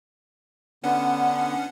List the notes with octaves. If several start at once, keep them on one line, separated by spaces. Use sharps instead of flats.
D3 B3 C#4 D4 F#5